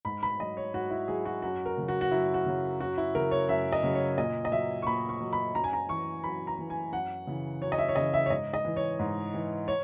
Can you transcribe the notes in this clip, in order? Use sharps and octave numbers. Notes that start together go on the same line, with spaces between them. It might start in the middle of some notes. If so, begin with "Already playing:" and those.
G#2 B5
B5
F#3 D#5
C#5
G#2 F#4
E4
F#3 G#4
F#4
F#2 F#4
A#4
C#3 F#3
F#4
F#4
F#2 E4
F#4
C#3 F#3
F#2 F#4
E4
C#3 F#3 A#4
C#5
F#2 E5
D#5
C#3 F#3
C#5
A#2 D#5
D#5
F#3 E5
C#6
A#2 B5
C#6
F#3
B5
F#2 A#5
G#5
A#5
E3 C#6
F#2 B5
A#5
E3
G#5
F#2 F#5
C#3 E3
F#2 C#5
D#5
E5
C#5
C#3 E3 D#5
E5
C#5
G#2 D#5
D#5
E3
C#5
G#2
E3
C#5